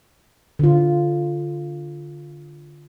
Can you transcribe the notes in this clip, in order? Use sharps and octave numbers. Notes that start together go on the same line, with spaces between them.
D3 F4